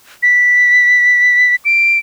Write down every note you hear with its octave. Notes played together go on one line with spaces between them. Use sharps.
B6
D7